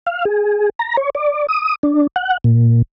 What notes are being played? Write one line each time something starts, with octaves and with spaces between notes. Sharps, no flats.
F5
G#4
A#5
C#5
D5
D#6
D4
F#5
A#2